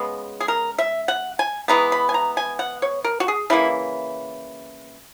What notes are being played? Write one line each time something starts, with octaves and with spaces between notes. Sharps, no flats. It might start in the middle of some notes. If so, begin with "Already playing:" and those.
Already playing: C#3 G#3 B3
G#4
A#4
E5
F#5
G#5
E3 G#3 B3 A#5
B5
G#5
A#5
G#5
F#5
C#5
A#4
F#4
G#4
C#3 E3 A#3 E4